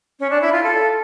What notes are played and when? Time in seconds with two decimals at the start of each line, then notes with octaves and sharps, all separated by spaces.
0.20 C#4
0.31 D4
0.42 E4
0.52 F4
0.63 A4